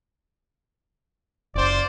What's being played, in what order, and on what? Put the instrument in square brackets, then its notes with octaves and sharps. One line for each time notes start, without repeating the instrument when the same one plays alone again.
[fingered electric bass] F#1 [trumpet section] F4 C5 D5